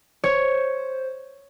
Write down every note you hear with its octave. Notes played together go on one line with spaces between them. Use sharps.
C5 C#5